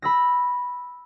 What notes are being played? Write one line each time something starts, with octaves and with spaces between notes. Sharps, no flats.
B5 E6 A#6